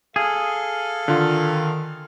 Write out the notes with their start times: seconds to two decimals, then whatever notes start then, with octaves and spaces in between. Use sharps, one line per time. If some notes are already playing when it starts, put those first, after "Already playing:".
0.16 G#4 A4 F5
1.08 D3 D#3 F4